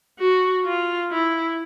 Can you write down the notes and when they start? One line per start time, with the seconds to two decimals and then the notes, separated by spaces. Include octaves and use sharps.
0.19 F#4
0.65 F4
1.11 E4